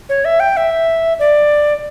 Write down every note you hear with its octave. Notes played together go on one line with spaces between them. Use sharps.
C#5
E5
G5
E5
D5